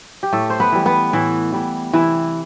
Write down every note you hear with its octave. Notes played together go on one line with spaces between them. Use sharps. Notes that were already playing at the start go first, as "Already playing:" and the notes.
G4
A2 A3 A4
C5
B3 B4
E3 G3
B3 B4
A2 E3 E4
E3 G3
C3 E3 E4